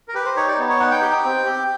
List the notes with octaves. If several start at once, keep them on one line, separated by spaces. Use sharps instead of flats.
A#4
G4 B4
C5
D#4 C#5
D5
B3
C#5
D#4 F#5
G5
G4
C4
G4